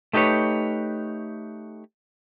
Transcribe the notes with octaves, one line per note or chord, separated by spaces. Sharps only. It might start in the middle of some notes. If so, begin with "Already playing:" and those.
A3 D#4 G4 B4 C#5